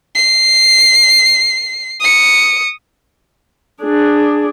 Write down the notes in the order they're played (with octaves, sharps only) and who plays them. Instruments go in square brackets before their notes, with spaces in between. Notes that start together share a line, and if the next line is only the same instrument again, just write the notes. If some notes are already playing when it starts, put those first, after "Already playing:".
[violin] C7
D#6 C#7
[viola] D4 G#4